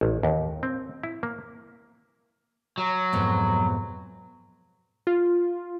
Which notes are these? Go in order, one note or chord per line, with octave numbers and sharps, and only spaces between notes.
A1
D#2
C4
E4
A#3
F#3
F2 G#2 B2
F4